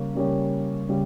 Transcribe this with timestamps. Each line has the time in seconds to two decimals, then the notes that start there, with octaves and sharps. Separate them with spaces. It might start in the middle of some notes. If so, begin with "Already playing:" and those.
Already playing: C#3 G3 A#3 C#4
0.15 C#3 G3 A#3 C#4
0.89 C#3 G3